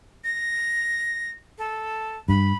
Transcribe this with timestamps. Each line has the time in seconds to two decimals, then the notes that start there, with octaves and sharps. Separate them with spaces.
0.24 A#6
1.58 A4
2.28 G2 B5